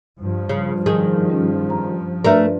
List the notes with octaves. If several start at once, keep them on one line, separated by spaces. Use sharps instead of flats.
G2 F3
C#3
D#3 G#4
G3 C#4
A#5
A3 D4 F#4 A#4 B4 D5